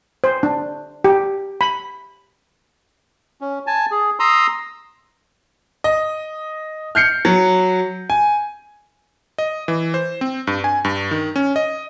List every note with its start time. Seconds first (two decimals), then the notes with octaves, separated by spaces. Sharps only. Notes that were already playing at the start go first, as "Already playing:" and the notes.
0.24 C5
0.43 D4
1.04 G4
1.61 B5
3.41 C#4
3.67 G#5 A5
3.91 G#4
4.20 A#5 C6 D#6 E6
5.84 D#5
6.95 F6 G6 C7 C#7
7.25 F#3
8.10 G#5
9.38 D#5
9.68 E3
9.94 C5
10.21 C4
10.47 G2
10.64 G#5
10.85 G2
11.11 D#3
11.36 C#4
11.56 D#5